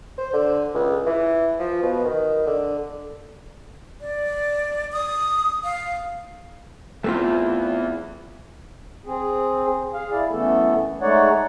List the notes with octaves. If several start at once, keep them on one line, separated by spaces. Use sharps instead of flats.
C5
D3
C#2
E3
F3
B2
D#3
D3
D5
D#6
F5
E2 A3 C4 F4
C4 G#4
G#4 F5
E4 D5
F#2 E3 A3 B3 A4
G#3 A3 D#4 C#5 D5 F#5